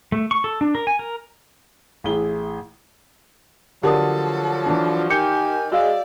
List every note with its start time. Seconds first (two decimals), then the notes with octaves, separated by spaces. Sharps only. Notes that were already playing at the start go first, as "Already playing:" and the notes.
0.12 A3
0.31 C#6
0.44 A4
0.61 D4
0.75 A#4
0.87 G#5
0.99 A#4
2.04 A1 E4 G#4 G7
3.83 D3 F3 F#3 G4 A4 A#4 D#6
4.66 E3 D4
5.10 D#3 G4 G#5 G6 C#7
5.72 G#3 F#4 D5 F5 E6